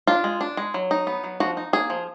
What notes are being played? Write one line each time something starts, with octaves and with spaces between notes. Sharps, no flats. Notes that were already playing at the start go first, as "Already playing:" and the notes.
D4 F4
G#3
D4
G#3
F#3
D#4
B3
F#3
F3 F#4
D#4
A#3 G#4
F3